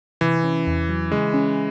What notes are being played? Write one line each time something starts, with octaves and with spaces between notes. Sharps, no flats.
C3 E3
C#4
E2
F#3
C#3 G#3
C#4